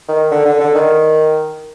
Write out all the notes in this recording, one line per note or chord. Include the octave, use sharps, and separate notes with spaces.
D#3
D3
D3
D3
D#3